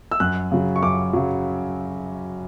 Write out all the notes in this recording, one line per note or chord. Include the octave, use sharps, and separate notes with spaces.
E6
F#2 F#6
C#3 F#3
C#6
F#2 D6
C#3 F#3